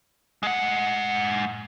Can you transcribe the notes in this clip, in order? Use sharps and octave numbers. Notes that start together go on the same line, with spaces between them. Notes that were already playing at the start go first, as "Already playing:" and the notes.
G#3 F#5